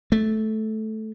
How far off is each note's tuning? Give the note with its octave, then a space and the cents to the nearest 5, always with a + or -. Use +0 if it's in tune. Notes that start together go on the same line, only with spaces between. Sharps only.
A3 -10